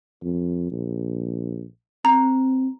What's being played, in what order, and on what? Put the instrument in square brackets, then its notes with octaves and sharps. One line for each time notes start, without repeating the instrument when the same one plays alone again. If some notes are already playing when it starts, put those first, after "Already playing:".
[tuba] F2
A#1
[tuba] C4 [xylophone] A#5